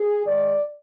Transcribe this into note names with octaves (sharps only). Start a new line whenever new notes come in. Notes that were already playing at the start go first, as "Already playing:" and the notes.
Already playing: G#4
G#2 D#3 G#3 D5